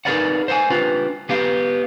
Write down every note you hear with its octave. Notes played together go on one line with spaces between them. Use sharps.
D#4 G#4 A#4 B4 D5 F#5
C5 F#5 G#5
D4 F4 G4 B4 C5
B3 G4 F5